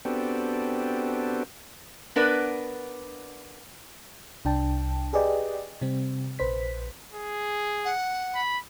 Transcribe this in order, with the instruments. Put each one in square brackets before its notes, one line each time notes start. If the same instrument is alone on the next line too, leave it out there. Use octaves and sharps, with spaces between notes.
[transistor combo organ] B3 C4 D4 F#4 G4 A4
[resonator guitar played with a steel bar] B3 D4 A#4 B4 D5
[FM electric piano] C2 D4 G5 A5
G4 G#4 B4 D5 D#5 G5
C3 G3 C4
A#1 B4 C5 B6
[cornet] G#4
[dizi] F#5
[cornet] B5